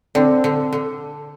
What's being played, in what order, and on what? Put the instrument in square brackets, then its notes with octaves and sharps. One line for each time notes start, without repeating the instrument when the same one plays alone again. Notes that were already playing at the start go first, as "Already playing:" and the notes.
[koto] D3 [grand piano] C4 D4
[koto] D3
D3